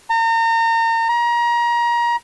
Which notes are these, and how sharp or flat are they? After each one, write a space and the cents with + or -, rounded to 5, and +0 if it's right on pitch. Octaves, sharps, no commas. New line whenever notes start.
A#5 -35
A#5 +30